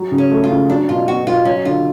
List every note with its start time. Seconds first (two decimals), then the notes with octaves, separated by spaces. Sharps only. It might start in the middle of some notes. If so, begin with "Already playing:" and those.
Already playing: F#3
0.12 C#3
0.18 C#4
0.31 A3
0.44 F4
0.50 C#3
0.69 F#3 D4
0.88 B2 F4
1.08 B3 F#4
1.27 B2 F4
1.45 F#3 C#4
1.65 D3 F4